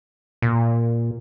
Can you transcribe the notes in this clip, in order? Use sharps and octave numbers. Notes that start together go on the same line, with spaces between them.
A#2